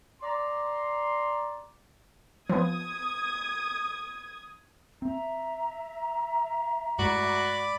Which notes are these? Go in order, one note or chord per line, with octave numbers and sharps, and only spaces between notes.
D5 A#5 C6
F3 B3 D#6 G#6
C4 E5 A#5
G2 G#3 A3 F#4 D5 B5 D6